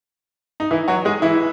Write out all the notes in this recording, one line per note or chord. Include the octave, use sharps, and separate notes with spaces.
D#4
E3 E4
F#3 F#4
G#3 G#4
E3 E4